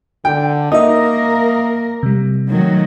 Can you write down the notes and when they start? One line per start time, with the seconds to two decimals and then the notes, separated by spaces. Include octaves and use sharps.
0.25 D3 G5
0.72 A#3 D#4 A#4 E5 D#6
2.03 C3 G3
2.48 D#3 F#3 A3